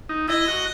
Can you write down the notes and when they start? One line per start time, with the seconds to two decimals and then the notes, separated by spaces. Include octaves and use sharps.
0.09 D#4
0.28 E4 D#5
0.48 F#4